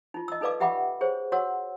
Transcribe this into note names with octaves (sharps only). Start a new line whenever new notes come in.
D#4 F4
D#5 E6
D#4 A4 B4 D5 F5 D6
G4 E5 F#5 G5 B5 D6
G#4 C5 C#5
F#4 C#5 F#5 E6